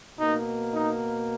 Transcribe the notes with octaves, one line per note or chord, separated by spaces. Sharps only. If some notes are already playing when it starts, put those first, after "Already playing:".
B2 A#3 D#4
D#4